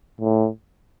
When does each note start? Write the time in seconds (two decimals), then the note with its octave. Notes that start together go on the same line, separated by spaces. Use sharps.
0.21 A2